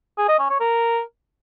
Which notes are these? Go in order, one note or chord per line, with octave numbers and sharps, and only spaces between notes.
G#4
D#5
C#4
C#5
A#4